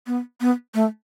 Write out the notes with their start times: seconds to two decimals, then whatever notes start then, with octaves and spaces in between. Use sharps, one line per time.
0.07 B3
0.41 B3
0.74 A3